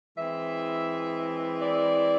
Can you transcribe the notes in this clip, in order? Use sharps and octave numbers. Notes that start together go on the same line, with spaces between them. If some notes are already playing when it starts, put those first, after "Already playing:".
E3 G#3 C4 E4 E5
D5